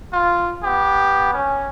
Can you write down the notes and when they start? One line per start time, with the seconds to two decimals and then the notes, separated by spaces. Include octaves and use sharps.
0.13 F4
0.64 B3 G4
1.34 C#4